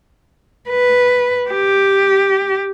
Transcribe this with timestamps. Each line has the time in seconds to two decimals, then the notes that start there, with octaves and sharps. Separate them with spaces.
0.70 B4
1.50 G4